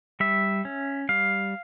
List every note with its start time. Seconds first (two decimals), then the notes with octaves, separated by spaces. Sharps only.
0.20 G3 E5
0.65 C#4
1.09 G3 F5